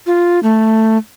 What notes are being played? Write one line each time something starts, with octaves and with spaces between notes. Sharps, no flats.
F4
A3